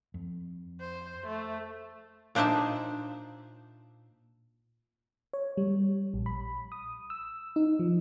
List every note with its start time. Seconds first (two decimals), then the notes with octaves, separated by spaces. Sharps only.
0.14 F2
0.80 C5
1.26 A3
2.35 A#2 D4 D#4 C5 E5 A5
5.33 C#5
5.57 G3
6.14 A#1
6.26 B5
6.72 D#6
7.10 E6
7.56 D#4
7.79 F3